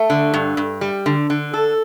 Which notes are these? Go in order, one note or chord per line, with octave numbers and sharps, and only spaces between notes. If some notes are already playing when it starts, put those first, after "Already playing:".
Already playing: A3
D3
G2
G2
G3
D3
D3
A4